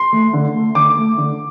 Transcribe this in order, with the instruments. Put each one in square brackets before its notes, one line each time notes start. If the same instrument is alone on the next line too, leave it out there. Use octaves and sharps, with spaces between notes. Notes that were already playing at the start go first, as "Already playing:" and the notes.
Already playing: [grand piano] C6
A3
D3
A3
D3 D6
A3
D3